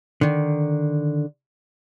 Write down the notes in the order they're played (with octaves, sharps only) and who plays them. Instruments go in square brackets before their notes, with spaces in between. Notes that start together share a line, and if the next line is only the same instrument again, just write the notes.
[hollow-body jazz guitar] D3 D#3